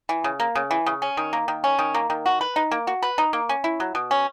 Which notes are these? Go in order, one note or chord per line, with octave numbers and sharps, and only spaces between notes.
E3
C#3
A#3
C#3
E3
C#3
C#4
D#3
A#3
D#3
C#4
D#3
A#3
D#3
F#4
B4
D#4
A#3
F#4
B4
D#4
A#3
C#4
E4
F#3
B2
C#4